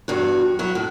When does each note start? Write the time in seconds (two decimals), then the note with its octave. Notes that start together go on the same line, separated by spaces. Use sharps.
0.08 E2 G2 F#4
0.59 F#3 E4 F#4
0.75 A2